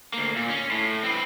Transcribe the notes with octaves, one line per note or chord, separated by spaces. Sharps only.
D2 A#3
A#2
C#4
A2
C4 B4